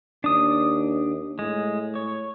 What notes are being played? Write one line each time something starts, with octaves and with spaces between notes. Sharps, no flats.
D#2 D4 D#6
A2 G#3
C#5